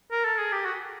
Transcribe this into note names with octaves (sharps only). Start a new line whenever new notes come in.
A#4
A4
G#4
G4
F#4